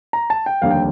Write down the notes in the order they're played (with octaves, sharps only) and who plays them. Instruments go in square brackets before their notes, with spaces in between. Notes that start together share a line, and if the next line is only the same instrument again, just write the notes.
[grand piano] A#5
A5
G5
F1 D#2 D3 G3 A#3 F5
G5